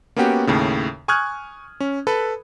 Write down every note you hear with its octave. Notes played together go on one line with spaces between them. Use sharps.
A#3 B3 C#4 F#4 G4
D#2 A2 C#3
G#5 C#6 D#6 F6 F#6 G#6
C#4
A4 B4 B5